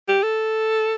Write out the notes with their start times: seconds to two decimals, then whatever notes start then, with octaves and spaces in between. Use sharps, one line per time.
0.09 G4
0.23 A4